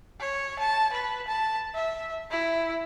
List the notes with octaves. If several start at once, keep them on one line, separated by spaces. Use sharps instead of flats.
C#5
A5
B4
A5
E5
E4